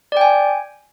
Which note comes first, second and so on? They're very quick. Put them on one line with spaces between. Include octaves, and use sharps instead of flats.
D5 G5 G#5